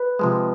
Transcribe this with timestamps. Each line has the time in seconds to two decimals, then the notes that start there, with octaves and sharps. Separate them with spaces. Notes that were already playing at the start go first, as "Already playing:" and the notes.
Already playing: B4
0.19 C3 F3 G#3